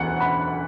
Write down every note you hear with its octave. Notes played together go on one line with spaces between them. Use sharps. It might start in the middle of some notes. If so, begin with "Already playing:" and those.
Already playing: E1 D2 E3 B3 F#5
B5